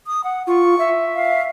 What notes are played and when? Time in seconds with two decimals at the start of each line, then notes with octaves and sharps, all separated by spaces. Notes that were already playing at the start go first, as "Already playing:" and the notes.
0.07 D#6
0.24 F#5
0.47 F4 C#6
0.79 E5
1.15 F5